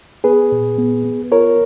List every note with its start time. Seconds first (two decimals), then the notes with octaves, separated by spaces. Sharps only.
0.24 B3 G#4 B4
0.52 A#2
0.78 B3
1.05 B3
1.32 F4 A#4 C#5